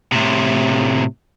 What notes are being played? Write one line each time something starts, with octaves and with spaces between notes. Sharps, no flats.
A2 C3